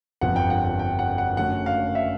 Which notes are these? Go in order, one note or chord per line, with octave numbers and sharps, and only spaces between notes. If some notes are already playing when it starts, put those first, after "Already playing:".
G1 F2 D3 F3 F#5
G5
F#5
G5
G5
F#5
F#5
F#2 D3 F#3 A3 C#4 F#5
F5
E5